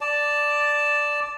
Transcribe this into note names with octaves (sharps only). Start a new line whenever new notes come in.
D5 A5